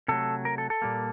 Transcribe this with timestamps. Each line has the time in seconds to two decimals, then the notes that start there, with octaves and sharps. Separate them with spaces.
0.08 C3 F#3 A3 A4
0.45 A#4
0.58 A4
0.70 A4
0.82 A#2 G3 A#3